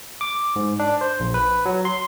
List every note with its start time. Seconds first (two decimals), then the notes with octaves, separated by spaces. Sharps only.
0.21 D6
0.56 G#2
0.79 D4
1.01 C5
1.20 A#1
1.34 B4
1.65 F#3
1.85 C6